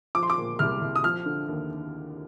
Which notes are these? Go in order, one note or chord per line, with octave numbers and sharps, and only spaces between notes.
F3 D6
C6
D6
A#2
C2 F6
C2
D#6
F3 F6
D3
D#2